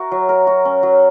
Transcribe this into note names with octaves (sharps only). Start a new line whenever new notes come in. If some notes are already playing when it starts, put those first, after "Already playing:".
Already playing: F#4 A#4 E5
F#3
A#4
F#4
C#4
F#3